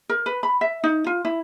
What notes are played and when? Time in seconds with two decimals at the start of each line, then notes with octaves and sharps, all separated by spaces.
0.09 A#4
0.26 B4
0.43 B5
0.61 E5
0.84 D#4
1.06 F4
1.25 E4